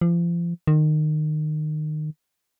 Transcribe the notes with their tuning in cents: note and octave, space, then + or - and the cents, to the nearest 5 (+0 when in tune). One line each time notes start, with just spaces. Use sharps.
F3 -35
D#3 -25